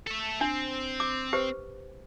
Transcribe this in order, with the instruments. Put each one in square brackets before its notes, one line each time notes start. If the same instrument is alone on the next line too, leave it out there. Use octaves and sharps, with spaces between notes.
[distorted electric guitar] A4 E5
[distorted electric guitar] C4 [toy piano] D4
[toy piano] D6
G4 B4 C5